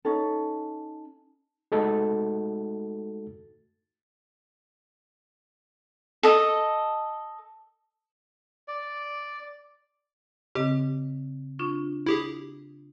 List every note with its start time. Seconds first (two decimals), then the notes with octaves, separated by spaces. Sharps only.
0.05 C#4 D#4 A4
1.72 G#3 A3 D#4 F#4 A4
6.23 A4 D#5
8.68 D5
10.55 C#3 C4 G4 D#5
11.59 D4 F4 C#6
12.06 E4 G4 G#4